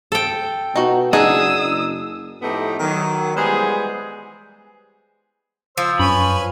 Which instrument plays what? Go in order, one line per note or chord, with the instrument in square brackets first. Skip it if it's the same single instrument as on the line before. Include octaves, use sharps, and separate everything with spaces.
[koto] A4 G5
[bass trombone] B2 [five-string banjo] D#4 F#4
[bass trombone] F#1 [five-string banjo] D4 D#4 F#5 [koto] G#4 [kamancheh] D#6 E6
[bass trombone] F#1
[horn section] A2 F3 A3 B3 D#4 G4
D#3 F#3
E3 G3 G#3 B3 G#4 C5
[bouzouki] F3 [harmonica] C5 E6
[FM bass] F#2 [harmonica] B4 C#5 G#5 [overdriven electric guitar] B5